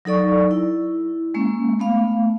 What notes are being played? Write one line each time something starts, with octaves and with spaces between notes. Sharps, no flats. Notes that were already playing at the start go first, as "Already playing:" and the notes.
F#3 D#4 A4 D5 C#6
E4
G#3 A#3 C#4
A3 B3 F5